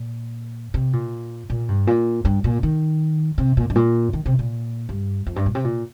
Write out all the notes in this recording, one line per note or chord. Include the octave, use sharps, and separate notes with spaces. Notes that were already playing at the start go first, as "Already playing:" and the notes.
Already playing: A#2
C3
A#2
A#2
G2
A#2
G2
A#2
D#3
C3
A#2
G2
A#2
D#3
C3
A#2
G2
F2
G2
A#2
C3
A#2